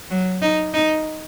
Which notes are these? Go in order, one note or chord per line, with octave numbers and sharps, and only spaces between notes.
F#3
D#4
D#4